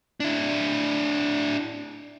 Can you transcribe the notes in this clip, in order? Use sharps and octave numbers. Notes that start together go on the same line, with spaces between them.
D4 E4